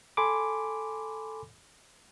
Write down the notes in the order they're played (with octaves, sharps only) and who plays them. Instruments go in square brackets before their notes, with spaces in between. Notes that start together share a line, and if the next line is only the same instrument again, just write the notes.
[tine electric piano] A4 G#5 B5 C6 D6